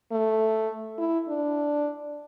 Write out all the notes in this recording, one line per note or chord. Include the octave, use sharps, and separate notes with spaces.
A3
E4
D4